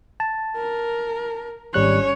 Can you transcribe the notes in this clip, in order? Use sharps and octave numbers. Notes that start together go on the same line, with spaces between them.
A5
A#4
G#1 G3 C#4 C#5 F#6